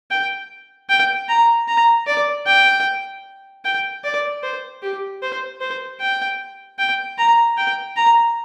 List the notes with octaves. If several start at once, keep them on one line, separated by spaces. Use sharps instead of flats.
G5
G5
A#5
A#5
D5
G5
G5
D5
C5
G4
C5
C5
G5
G5
A#5
G5
A#5